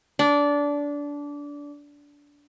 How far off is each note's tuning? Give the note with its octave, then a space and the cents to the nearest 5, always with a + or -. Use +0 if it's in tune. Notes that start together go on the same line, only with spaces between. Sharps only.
D4 -20